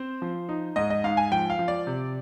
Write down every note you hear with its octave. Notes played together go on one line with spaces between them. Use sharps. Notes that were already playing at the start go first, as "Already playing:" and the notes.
Already playing: C4 C5
F3
D#4
G#2 D#5
D#5
G#2 F5
G#5
F3 G5
F5
F3
D5
C3